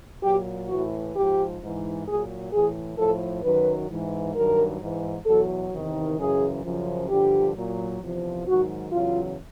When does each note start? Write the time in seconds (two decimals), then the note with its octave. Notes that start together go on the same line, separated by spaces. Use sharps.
0.23 A#2 F#3 G4
0.68 A2 E3 F#4
1.14 G#2 F3 G4
1.60 G#2 E3
2.06 A#2 F#3 G#4
2.52 A2 E3 G#4
2.97 A2 F3 A4
3.43 F#2 D#3 F#3 B4
3.90 G#2 E3
4.35 G2 D#3 F#3 A#4
4.80 G#2 E3
5.26 E2 B2 F#3 A4
5.72 E2 C3 D#3
6.17 F#2 C#3 E3 G#4
6.63 F#2 C#3 F3
7.09 G2 D3 F3 G4
7.55 A#2 F#3
8.01 E2 C3 F3
8.47 G#2 D#3 F#3 F#4
8.92 E2 C#3 F#3 F4